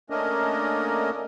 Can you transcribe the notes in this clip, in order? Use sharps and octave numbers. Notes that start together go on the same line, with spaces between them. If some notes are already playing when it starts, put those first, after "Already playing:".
A3 A#3 C#4 D4 A#4 D#5